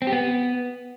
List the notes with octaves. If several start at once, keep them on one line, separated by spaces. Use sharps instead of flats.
C4
G4
B3